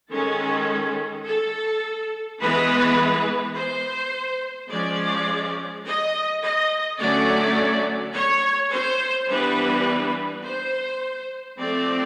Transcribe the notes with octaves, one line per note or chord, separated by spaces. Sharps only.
D#3 G#3 C#4 A4
A4
E3 G#3 B3 B4
C5
F3 G#3 C#4 D5
D#5
D#5
D3 F#3 A3 C#4 D5
C#5
C5
E3 G3 B3 D4 B4
C5
F3 A3 C4 D5